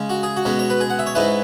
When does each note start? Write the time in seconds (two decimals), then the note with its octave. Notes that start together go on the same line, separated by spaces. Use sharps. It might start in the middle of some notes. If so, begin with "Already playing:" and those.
Already playing: C#3 G#3 C#4
0.09 F#4
0.23 G#4
0.36 F#4
0.45 B2 G#3 C#4
0.59 C#5
0.70 B4
0.80 G#4
0.90 F#5
0.99 E5
1.06 C#5
1.15 G#2 G#3 C#4 E4 B4